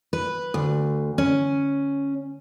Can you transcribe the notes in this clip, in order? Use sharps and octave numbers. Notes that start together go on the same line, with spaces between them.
B4
D2
C#4